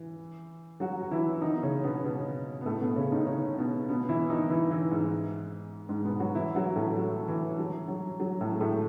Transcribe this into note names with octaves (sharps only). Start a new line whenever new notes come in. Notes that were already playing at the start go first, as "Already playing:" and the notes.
Already playing: E3
F#3 F#4
F#4
E3 E4
D#3 D#4
B3
C#3 C#4
B2 B3
B2 B3
B3
A2 A3
B2 B3
C#3 C#4
D#3 D#4
C#3 C#4
B2 B3
B2 B3
E3 E4
D#3 D#4
E3 E4
E3 E4
G#2 G#3
G#2 G#3
B2 B3
F#3 F#4
E3 E4
F#3 F#4
A2 A3
F#3
E3
F#3
F#3
F#3
A2 A3
G#3
A2 A3